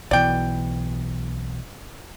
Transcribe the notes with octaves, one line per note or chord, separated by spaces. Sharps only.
B1 B2 E3 D5 G5